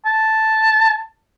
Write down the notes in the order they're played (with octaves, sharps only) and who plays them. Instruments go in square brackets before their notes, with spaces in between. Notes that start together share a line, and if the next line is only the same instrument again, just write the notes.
[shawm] A5